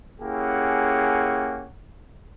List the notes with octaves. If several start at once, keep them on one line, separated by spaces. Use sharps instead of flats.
A#3 C#4 E4 G4 G#4 F#5